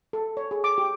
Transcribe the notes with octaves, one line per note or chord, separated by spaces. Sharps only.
A4
C#5
G#4
D6
G4